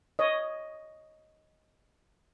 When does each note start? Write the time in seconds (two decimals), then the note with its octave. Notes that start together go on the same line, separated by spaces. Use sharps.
0.19 C#5 D#5